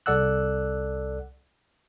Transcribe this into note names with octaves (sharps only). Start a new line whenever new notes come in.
C2 A4 D5 F#5 E6 F#6